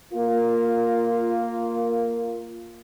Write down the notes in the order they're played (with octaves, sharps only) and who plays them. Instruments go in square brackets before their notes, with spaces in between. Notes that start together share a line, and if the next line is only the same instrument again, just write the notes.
[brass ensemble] A#3 F4